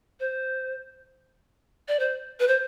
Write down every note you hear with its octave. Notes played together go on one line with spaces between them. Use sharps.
C5
D5
C5
B4
C5